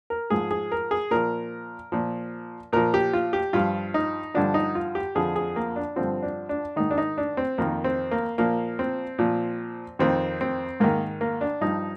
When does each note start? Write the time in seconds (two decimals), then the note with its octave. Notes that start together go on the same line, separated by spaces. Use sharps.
0.10 A#4
0.30 G#2 F3 G#4
0.51 G#4
0.72 A#4
0.91 G#4
1.11 A#2 F3 A#4
1.92 A#2 F3
2.73 A#2 F3 A#4
2.94 G4
3.13 F4
3.33 G4
3.53 G2 F3 F4
3.94 D#4
4.34 G2 D3 F3 D4
4.54 D#4
4.75 F4
4.95 G4
5.15 F2 D3 F3 G#4
5.36 G#4
5.56 A#3
5.76 D4
5.96 G2 D3 F3 C4
6.23 D4
6.49 D4
6.76 G#2 D#3 D#4
6.91 D4
6.98 D#4
7.18 D4
7.37 C4
7.58 F2 D#3 A#3
7.84 C4
8.11 A#3
8.38 A#2 F3 A#3
8.79 C4
9.19 A#2 F3
9.99 F2 D#3 C4
10.41 C4
10.80 G#2 D#3 A#3
11.21 A#3
11.41 D4
11.61 G2 F3 D#4